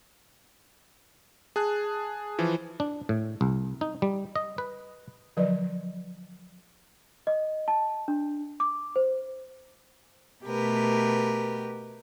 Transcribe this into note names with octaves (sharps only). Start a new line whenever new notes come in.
G#4 A5 F#6
E3 F3
D4
A2
C2
D#4
G3
D#5
B4
D3 F3 F#3 B4 D5
D#5
A5
D4
D6
C5
B2 A3 G4 A#4 B4